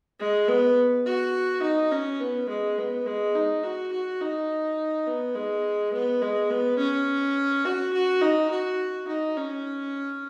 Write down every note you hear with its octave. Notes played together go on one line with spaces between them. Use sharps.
G#3
B3
F#4
D#4
C#4
B3
G#3
B3
G#3
D#4
F#4
F#4
D#4
B3
G#3
B3
G#3
B3
C#4
F#4
F#4
D#4
F#4
D#4
C#4